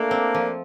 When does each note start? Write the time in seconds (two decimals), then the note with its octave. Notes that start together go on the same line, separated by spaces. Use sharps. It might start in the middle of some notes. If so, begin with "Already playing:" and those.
Already playing: A3 A#3 D4
0.11 C4
0.34 F3